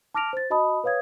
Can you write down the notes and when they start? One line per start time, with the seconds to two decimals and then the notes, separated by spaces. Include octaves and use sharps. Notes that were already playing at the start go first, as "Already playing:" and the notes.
0.14 A5 D6 F6 A#6 D7 F7
0.33 C5 A6
0.50 F#4 D#5 A5 B5 D#6
0.84 B4 C#5 F5 D#6 G#6